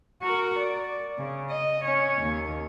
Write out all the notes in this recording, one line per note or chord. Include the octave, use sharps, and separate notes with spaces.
F#4 A#4
D5
C#3
D#5
C#4 C#5
D#2